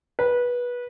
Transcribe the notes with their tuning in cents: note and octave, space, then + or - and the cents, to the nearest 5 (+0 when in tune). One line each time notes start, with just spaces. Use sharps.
B4 -20